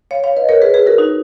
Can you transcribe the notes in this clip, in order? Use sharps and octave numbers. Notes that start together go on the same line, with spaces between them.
C#5 F5
C#5 F5
B4 D#5
A#4 C#5
G#4 B4
G#4 B4
F#4 A#4
D#4 F#4